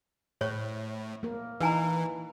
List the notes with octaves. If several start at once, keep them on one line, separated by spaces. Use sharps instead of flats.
A2 C5 C#5 C#6
A#3 A#4
E3 D#4 E4 B4 F5 G#5 A#5